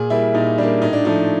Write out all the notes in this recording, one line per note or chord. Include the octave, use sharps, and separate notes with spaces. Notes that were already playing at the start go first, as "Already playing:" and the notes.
Already playing: A#2 G#4
G3 A#3 E4
A#2 D#4
G3 A#3 D4
A2 D#4
D4
F3 A3 D#4